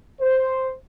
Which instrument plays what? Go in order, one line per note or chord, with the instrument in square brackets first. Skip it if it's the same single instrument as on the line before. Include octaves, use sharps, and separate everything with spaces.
[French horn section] C5